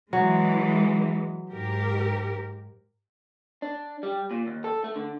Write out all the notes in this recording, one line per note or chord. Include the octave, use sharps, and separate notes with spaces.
E3 F#3 G#3
G#2 G4 A#4
D4
G3
A#2
D#2
A4
A3
D3